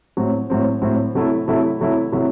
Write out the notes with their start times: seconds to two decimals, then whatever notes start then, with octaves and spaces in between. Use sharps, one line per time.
0.17 A2 F#3 C4
0.50 A2 F#3 C4
0.82 A2 F#3 C4
1.15 C3 F#3 A3 E4
1.48 C3 F#3 A3 E4
1.80 C3 F#3 A3 E4
2.12 C3 F#3 A3 E4